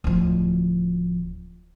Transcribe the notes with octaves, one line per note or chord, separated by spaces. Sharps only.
D1 F3